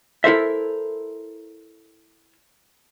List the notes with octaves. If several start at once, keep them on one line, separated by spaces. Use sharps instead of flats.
E4 A4 A#4 C5 E5